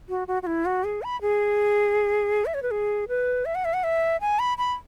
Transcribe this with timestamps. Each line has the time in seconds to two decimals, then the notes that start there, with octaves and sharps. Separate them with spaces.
0.09 F#4
0.28 F#4
0.43 F#4
0.47 E4
0.66 F#4
0.84 G#4
1.03 B5
1.21 G#4
2.46 E5
2.54 C#5
2.63 B4
2.71 G#4
3.09 B4
3.45 E5
3.55 F#5
3.65 E5
3.74 F#5
3.84 E5
4.21 G#5
4.39 B5
4.58 B5